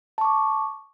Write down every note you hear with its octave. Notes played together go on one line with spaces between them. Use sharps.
A5 C#6 D6